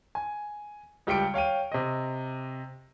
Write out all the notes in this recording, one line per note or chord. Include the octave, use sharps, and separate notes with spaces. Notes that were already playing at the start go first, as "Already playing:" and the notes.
G#5
C#2 G3 G5 C#7 D7
C#5 F5 G5 D#7
C3 D#5